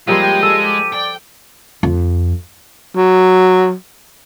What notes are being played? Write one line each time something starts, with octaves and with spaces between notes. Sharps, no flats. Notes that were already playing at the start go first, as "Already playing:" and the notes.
F3 G3 G#3 A#3 C4 D#7
G5
A4 E6
G4
D5 G5
F2
F#3